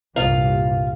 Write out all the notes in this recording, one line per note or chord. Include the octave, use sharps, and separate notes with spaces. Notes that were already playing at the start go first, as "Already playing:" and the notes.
C2 G2 A#2 F4 F5